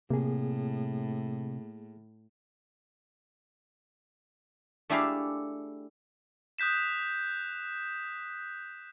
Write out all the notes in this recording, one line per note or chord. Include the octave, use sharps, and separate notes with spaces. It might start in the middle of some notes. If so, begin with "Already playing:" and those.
A2 C3 A#3 G#4
A3 D4 E4 G4 G#4 F5
D#6 F#6 G6 B6 E7